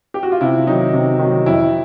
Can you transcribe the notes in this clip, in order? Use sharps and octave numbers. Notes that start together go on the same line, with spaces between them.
G4
F#4
F4
C3 E4
D#3 F#3 D#4
C3
D#3 F#3
F2 E4